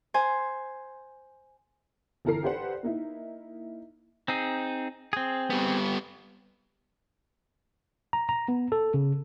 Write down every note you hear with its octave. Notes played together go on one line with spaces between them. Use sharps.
C5 G#5
G1 E3 A4 A#4 A#5 C7
G4 A4 B4 C5 D5 F#5
A#3 D#4 E4
C4 D#4 G#4
C4 G#4
G3 B3
A#5
A#5
B3
A4
C#3